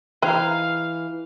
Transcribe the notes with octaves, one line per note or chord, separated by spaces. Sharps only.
E3 D#4 G#4 B4 C5 F5 G5